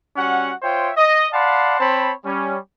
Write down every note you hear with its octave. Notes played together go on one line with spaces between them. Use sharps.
G3 C#4 F#4 F#5
F4 C5 C#5 E5 G5
D#5
D5 F5 F#5 A5 B5 C6
C4 C5 C#5 A5 B5
G3 C#4